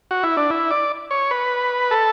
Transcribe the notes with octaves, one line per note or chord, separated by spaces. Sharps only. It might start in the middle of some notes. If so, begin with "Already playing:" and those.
F#4
E4
D4
E4
D5
C#5
B4
A4